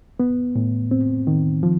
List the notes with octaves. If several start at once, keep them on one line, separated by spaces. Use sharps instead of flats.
B3
A2
C4
D#3
F3